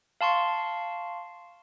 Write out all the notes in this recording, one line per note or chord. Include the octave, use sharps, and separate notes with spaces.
F5 A5 C6 C#6